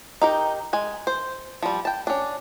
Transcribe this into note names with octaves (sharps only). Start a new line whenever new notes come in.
D#4 G4 A#4
G#3 G#5
C5
F3 G3
G5 A5
C#4 D4